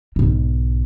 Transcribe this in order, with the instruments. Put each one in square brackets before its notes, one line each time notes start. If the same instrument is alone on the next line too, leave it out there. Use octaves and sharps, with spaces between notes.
[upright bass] B1 G#2